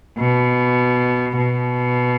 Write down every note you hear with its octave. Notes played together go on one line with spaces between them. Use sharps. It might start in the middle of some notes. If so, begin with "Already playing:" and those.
B2
B2